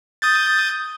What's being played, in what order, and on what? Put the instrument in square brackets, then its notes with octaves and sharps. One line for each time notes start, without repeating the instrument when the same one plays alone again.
[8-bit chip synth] D#6 G6 A6